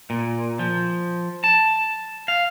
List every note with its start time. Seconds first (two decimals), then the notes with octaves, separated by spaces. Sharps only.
0.10 A#2
0.59 F3
1.44 A5
2.28 F5